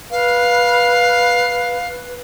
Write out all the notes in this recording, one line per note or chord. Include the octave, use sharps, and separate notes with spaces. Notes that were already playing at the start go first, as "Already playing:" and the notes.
B4 F5